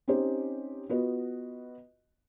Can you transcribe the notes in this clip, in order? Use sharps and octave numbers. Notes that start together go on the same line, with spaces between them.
C4 C#4 D#4 G4 C5
B3 F4 F#4 B4 D#5